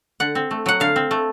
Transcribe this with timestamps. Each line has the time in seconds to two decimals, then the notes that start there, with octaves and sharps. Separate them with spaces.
0.20 D3 F#5
0.35 C4
0.51 A3
0.66 F#3 F#5
0.80 D3 F5
0.96 C4
1.11 A3